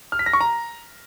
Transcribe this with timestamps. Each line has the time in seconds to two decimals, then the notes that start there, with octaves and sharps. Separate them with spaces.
0.12 F6
0.19 B6
0.26 A#6
0.33 C#6
0.41 A#5